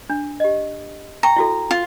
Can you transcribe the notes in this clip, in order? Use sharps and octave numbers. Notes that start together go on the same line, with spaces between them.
D4
G4 D#5
G5 A#5 C#6
E4 F#4 A4
F4